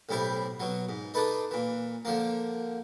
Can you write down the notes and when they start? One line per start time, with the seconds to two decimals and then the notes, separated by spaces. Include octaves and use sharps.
0.09 B1 A2 G3 E4 C5 E5
0.60 B2 F#3
0.89 G#2
1.14 D4 D#4 A4 B4 D#5
1.51 A#2 E3
2.05 D3 F3 A#3